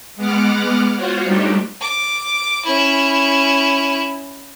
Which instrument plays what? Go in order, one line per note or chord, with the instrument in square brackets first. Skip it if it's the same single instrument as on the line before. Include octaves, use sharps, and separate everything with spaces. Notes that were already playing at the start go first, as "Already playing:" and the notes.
[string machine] G#3 B3 F#5 D6 F6
F4 F#4 C5 C#5
G3 A3 D4 D#4 G4
[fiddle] D6
C#4 E4